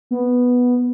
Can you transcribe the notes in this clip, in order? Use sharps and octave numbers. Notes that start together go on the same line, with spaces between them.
B3